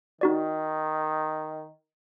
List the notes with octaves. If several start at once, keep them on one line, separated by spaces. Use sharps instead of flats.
D#3 D#4 F#4 D5